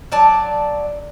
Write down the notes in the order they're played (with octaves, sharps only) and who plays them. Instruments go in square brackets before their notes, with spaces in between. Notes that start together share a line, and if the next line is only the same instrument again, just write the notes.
[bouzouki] F#3 D5 A5